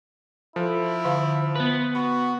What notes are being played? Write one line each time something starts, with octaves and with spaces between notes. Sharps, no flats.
F3 E4 A4
D3 F5 C6
B3 B4
F#4 B5